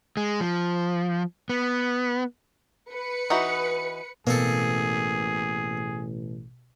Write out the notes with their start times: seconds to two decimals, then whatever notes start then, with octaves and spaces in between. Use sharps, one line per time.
0.17 G#3
0.41 F3
1.49 B3
2.90 B4 C#7
3.30 E3 D#4 F#4
4.27 A1 B2 A#3 C4 G#4 A4